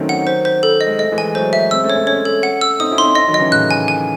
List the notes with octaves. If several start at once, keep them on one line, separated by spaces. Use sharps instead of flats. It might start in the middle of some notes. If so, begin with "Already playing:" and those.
Already playing: D#3 F#3 A3 C4 C#4 D#4
F#5
C5
C5
A4
D#5
G#3
A3 D#5
E3 G#3
G#5
F#3 A3 C5
E5
G#3 C4 E6
A3 C#4
C#5
A3 C#4
A3 C#4 C#5
A4
F#5
E6
C4 D#4 D#6
C#4 E4
C6
C4 D#4
D#5
D#3 F#3
D#5
C#3 E3
A2 C#3 F#6
G#5
G#5